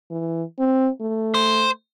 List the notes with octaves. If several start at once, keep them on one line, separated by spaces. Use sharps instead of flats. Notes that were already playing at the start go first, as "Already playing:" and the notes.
E3
C4
A3
C5